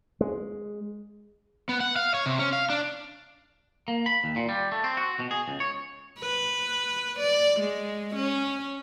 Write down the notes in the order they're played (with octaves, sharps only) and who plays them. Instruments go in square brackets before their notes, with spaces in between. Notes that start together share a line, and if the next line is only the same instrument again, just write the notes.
[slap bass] G#3
[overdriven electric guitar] B3
F#5
F5
C#5
C3
C#4
F5
D4
[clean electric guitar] A#3
B5
D#2
A#2
G3
A3
C4
F#4
B2
G#4
C#2
C#5
[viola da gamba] B4
D5
G#3
C#4